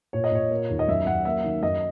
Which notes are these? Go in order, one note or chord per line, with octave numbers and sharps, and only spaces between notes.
A#2 C#5
D#5
A#2 C#5
A#3
D#2
D#5
F#2 E5
F#2 F#5
A#3 E5
D#3
F#2 D#5